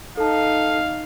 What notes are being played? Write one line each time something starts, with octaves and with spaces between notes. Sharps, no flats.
D#4 A4 F5 A5